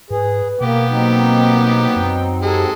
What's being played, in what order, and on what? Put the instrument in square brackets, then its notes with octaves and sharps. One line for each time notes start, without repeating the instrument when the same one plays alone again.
[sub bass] G#2 [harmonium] G#4 [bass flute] B4
[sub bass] B2 [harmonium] A#3 [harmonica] B3 G5 D6
[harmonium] F#3 C4 D#4 [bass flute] A#3
[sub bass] F#2
[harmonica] G#3 A4 [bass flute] G4